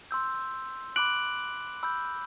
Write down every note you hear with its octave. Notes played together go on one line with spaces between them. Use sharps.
C6 E6 G6
B5 D6 F#6 D7 F#7
B5 E6 G6